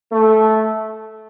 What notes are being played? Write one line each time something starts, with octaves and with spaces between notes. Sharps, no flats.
A3